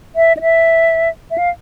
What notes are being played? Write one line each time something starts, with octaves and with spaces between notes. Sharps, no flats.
E5
D#5
E5
E5
F5